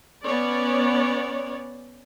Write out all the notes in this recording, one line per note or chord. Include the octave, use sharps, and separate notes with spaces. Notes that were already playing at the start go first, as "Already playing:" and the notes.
B3 C#4 C#5 D5